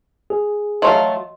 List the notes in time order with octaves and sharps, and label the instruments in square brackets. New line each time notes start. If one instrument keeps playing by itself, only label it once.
[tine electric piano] G#4
[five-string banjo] F#3 A3 F4 [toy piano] D#5 C6